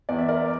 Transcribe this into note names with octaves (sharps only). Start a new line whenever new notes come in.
E2 D5
E5
A#4 D5